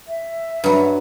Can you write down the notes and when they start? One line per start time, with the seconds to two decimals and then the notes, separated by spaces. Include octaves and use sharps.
0.08 E5
0.64 G2 F#3